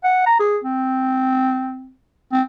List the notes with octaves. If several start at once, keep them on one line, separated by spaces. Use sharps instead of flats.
F#5
A#5
G#4
C4
C4